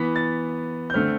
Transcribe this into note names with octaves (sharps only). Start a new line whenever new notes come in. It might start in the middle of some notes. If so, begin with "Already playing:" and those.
Already playing: E3 B3 B6
A6
G6
D3 A3 C4 F6